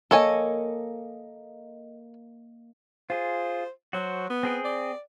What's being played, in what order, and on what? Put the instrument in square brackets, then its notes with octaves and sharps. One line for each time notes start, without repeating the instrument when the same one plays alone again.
[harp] A#3 D#5 [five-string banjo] A4 C#5 G#5
[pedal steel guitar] F4 G#4 [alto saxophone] C5
[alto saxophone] F#3 [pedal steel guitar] F#4 C5
[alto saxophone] B3
[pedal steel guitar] C4 G#4 G5
[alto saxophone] D5